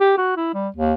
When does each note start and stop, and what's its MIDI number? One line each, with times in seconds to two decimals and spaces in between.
0.01 0.14 67
0.18 0.37 66
0.37 0.52 64
0.54 0.68 55
0.76 0.94 39